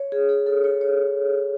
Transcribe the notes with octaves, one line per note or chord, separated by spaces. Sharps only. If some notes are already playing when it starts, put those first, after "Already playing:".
Already playing: C#5
G#4
G#4
A4
C#5
C#5